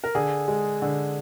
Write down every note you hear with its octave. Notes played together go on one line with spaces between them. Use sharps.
A#4
D3 G#4
G#3
D3